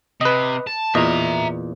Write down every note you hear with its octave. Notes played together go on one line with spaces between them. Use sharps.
C3 B4 D#5
A5
E2 A#2 D#5 E5 A#5